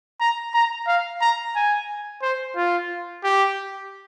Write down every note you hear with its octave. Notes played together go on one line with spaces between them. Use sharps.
A#5
A#5
F5
A#5
G#5
C5
F4
G4